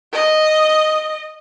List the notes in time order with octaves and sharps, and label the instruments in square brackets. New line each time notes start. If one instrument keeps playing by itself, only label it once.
[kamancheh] D#5